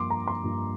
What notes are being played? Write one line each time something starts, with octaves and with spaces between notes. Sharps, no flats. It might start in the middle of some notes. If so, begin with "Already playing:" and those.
Already playing: G2 F3 A#3 C6 D6
A#5
C6
G2 F3 A#3